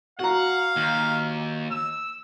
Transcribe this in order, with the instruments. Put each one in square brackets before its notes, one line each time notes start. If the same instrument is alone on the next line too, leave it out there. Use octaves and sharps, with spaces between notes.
[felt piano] F#4 A#5 [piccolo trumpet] F5 [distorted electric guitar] F#5
[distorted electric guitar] D#2
[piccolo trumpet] E6